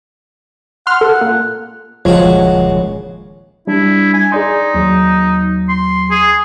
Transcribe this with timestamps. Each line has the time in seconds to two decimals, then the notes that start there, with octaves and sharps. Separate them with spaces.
0.87 F#5 C6 F6
1.01 A4
1.21 A#2
2.05 D#1 C#2 F3 G#3 F#4 C#5
3.67 G3 D4 E4
4.14 G#5
4.32 D#4 G#4 D5 C6
4.74 D#2 F#3
5.69 C6
6.11 G#4